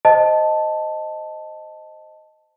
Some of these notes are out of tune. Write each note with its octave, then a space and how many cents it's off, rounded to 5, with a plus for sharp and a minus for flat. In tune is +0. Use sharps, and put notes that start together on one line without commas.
C5 +0 D#5 +0 A5 +0